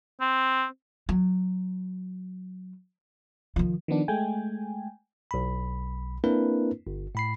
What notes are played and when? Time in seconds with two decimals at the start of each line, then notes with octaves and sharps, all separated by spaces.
0.21 C4
1.09 F#3
3.56 D#3 F3
3.88 D#3 F3 B3 D4
4.08 G#3 A3 G5 G#5
5.31 B1 B5
6.24 A#3 C4 D4 E4 A#4 B4
6.87 G1
7.15 A2 B5 C7